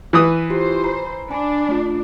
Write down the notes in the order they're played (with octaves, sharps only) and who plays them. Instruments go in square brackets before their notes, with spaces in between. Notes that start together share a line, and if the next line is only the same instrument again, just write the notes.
[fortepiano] E3 B4 D#6
[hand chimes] E4 F4 G4 [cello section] C5
[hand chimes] A#5 B5
[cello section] D4 [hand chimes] G#5 B5
[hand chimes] A3 F4